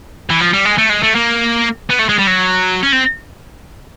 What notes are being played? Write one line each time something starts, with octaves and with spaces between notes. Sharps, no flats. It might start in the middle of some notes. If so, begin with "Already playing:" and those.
E3
F3
G3
G#3
A3
G#3
A3
A#3
B3
A3
G#3
G3
F#3
C#4
C4